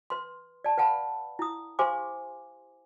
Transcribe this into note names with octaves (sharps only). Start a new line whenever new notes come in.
B4 C6
D5 A5
B4 F5 F#5 A5 B5
E4 D#6
G4 C5 F5 G#5 C6 D6